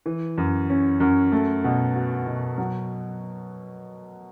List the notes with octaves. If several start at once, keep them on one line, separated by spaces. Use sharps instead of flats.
E3
F#2
C#4
F#2
A3
B2
F#4
B2
F#3